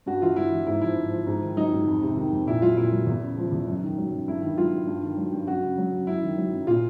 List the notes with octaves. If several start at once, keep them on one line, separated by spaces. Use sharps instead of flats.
G2 F#4
E3 F4
G2 E4
E3
G#2 E4
F3 E4
G#2
F3
G#2
D#3
F#3 D#4
G#2
F2
C3
D#3
F2
A#2 E4
F#3 F4
A#2 E4
F#3
E2
C#3
F3
E2
F#2
D#3
F#3
F#2
G2 E4
D#3
F#3 F4
G2
G2
D#3
F#3
G2
F#2 F#4
C#3
F#3
F#2
F#2 E4
D#3
F#3
F#2
A#2 F4